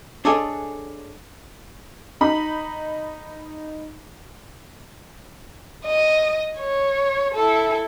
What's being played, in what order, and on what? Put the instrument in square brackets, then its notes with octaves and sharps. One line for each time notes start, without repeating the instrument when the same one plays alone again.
[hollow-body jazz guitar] D4 G#4 A4 C#5 D#5 G#5
[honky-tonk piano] D#4 B5
[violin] D#5
C#5
E4 A4